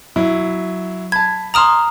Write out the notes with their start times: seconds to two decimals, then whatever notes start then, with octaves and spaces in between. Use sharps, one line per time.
0.16 F#3 E4
1.12 A5 B5 G#6
1.54 A#5 C6 D#6 F6 E7 F#7